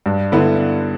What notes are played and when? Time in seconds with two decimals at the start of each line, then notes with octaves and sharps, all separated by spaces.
0.06 G2
0.32 D3 B3 E4 B4